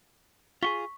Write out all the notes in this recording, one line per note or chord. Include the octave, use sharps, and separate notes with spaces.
F4 F#4 G#4 C#6 B6 G7